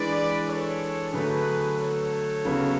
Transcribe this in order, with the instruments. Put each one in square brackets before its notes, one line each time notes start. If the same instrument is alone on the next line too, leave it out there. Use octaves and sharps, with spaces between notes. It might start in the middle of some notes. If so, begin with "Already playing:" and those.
Already playing: [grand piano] E3 G#3 D4 [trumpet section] B4 D5
[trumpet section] A4 C#5
[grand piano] D3 F#3 A3 [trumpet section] G#4 B4
[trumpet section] A4 C#5
[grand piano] C#3 F#3 B3